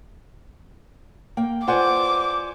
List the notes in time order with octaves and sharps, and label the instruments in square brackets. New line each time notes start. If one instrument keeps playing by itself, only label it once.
[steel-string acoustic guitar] A#3 G5
[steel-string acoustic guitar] F4 B4 D5 [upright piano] C5 F#5 G#5 [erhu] D6